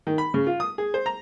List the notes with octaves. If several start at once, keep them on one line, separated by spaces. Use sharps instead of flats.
D#3
B5
C#3
F4
D#6
G#4
C5
A#5